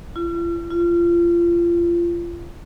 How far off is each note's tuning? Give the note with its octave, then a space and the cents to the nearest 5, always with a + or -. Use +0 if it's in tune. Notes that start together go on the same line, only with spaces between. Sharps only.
F4 -45
F4 -30